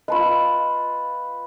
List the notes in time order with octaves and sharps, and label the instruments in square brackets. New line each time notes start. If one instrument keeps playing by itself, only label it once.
[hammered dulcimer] F4 B4 [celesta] D#5 A5 B5